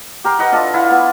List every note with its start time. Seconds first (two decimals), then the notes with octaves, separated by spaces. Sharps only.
0.24 G4 A#4 G5 C6
0.39 B4 D#5 F#5 B5
0.52 D4 F4 A4 D#5
0.74 E4 F4 F#5
0.90 B3